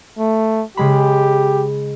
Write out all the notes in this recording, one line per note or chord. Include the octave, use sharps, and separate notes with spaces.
A3
C#3 G#3 G4 B5